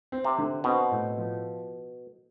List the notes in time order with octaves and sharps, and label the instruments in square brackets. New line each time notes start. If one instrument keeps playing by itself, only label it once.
[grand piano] C4
[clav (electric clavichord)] C3
[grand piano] D3
[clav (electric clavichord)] B2 [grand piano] C4
[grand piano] A2
F3